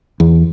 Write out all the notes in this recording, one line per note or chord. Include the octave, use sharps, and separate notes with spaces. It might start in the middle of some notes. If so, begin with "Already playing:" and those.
E2